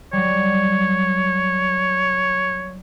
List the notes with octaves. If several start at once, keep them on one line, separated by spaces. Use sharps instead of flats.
F#3 G3 C#5